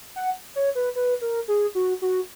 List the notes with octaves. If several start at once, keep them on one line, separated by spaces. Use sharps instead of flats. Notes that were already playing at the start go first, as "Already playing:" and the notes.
F#5
C#5
B4
B4
A#4
G#4
F#4
F#4